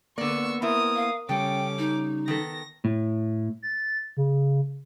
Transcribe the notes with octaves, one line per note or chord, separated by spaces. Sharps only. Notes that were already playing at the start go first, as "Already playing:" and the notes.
D3 A#3 B3 D5 C#6 E6
C4 E4 A#4 D#6
F5
C#3 G3 C#4 A4 G5 D6
D#4
D#3 B3 A4 A#6
A2
A6
C#3